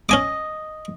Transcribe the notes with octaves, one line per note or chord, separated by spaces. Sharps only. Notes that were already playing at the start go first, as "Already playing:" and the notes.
C#4 D#5 G#5 D6